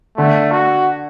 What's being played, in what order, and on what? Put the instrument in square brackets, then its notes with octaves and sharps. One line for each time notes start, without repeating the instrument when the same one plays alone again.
[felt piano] D3 [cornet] A3
[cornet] F#4